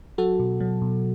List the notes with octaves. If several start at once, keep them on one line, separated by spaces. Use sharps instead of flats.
F#3 F#4 A4
B2
F#3
B2